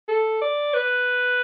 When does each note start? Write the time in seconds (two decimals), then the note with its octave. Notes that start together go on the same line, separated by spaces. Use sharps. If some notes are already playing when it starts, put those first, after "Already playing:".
0.09 A4
0.42 D5
0.74 B4